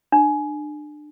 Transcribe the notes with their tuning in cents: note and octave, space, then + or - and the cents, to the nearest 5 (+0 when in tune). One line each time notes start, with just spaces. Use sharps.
D4 +30